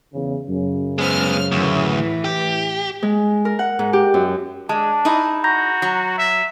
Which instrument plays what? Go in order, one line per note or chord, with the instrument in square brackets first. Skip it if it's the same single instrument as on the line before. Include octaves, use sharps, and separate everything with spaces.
[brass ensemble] E2 C#3
F#2 C#3
[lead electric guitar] G#3 B3 [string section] C5 F6
[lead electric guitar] D2 [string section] A2 E3
[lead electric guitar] G4
[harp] G#3
A#4
F#5
G#2
G4
F#2
[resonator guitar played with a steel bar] G#3 [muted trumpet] D4 [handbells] A5
[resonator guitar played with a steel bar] D#4 E4 G#4
[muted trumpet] F#4 [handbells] A#5 G6 A#6
[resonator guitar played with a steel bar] F#3
[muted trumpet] E5